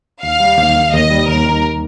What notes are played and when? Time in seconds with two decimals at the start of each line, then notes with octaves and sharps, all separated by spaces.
0.23 D#2 F5
0.40 G3
0.57 D#2
0.76 D#3
0.93 D#2 D#5
1.10 G3
1.28 D#2 A#4
1.45 D#3